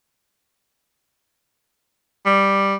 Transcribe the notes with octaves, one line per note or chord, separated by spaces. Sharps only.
G3